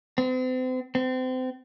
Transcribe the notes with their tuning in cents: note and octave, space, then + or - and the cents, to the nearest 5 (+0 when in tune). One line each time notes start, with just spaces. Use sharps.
C4 -40
C4 -30